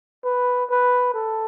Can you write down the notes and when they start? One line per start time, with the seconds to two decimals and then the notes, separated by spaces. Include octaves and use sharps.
0.25 B4
0.70 B4
1.14 A4